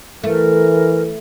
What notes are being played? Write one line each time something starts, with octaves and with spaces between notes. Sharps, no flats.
E3 A3 A#4